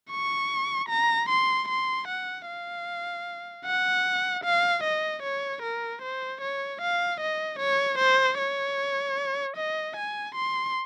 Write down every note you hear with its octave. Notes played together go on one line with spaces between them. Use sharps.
C#6
A#5
C6
C6
F#5
F5
F#5
F5
D#5
C#5
A#4
C5
C#5
F5
D#5
C#5
C5
C#5
D#5
G#5
C6